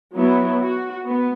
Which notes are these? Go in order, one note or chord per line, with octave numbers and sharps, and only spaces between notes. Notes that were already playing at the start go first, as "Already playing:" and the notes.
F#3 B3 E4
F#4
B3